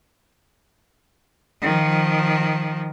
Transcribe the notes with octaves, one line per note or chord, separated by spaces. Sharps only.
D#3 F3